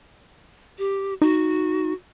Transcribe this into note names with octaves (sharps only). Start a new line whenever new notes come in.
G4
D#4 F#4